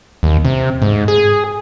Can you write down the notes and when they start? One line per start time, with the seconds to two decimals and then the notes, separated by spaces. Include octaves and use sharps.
0.23 D#2
0.45 C3
0.82 G#2
1.08 G#4